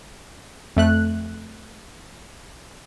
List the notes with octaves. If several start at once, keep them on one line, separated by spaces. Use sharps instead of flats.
F2 A3 F#6